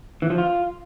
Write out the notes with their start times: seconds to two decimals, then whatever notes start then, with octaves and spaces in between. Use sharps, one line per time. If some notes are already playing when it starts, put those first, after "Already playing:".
0.22 E3
0.30 F3
0.38 F4